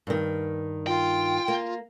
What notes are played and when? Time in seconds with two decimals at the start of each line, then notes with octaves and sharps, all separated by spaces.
0.07 G2 D#3
0.87 F4 G5
1.48 A#3